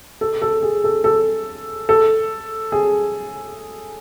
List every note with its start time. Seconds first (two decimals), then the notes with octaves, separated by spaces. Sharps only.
0.21 A4
0.42 A4
0.62 G#4
0.84 A4
1.04 A4
1.89 A4
2.72 G#4